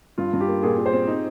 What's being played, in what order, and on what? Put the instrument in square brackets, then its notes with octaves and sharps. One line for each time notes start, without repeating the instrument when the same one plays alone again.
[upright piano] G2 [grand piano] F4
[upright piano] G2
[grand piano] G4
[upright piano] A#3
[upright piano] A#2 [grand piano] G#4
[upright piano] A#2
[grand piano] C5
[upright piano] C4
D#4